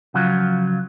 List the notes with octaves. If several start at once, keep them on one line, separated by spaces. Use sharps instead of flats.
C#3 F3 F#3 F4